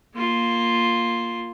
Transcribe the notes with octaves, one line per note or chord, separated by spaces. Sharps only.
A#3 F4